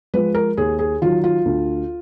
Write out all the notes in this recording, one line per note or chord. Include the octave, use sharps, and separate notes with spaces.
F3 G#3 B4
A#4
D#2 G#4
G#4
D#3 F#3 F4
F4
D2